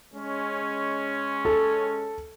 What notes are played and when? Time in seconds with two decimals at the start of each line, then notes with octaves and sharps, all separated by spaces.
0.15 G#3 C#4
1.45 A4